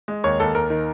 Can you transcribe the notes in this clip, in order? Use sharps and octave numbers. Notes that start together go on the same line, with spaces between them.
G#3
D#2 C#5
D#2 A4
D#2 A#4
D#3